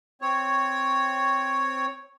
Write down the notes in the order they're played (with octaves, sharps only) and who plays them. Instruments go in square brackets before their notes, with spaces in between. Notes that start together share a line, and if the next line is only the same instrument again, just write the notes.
[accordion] C4 C#5